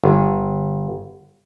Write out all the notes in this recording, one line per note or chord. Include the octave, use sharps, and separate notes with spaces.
G1